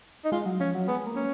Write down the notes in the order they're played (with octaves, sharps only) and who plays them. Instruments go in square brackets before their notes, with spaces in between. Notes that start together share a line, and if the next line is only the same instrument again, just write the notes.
[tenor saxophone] D#4
[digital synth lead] G#3 [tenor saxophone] F4
[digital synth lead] F#3
[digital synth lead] F3 [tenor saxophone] C#4
[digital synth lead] F#3
[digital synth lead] G#3 [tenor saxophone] B3
[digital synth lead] A#3
[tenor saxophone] C#4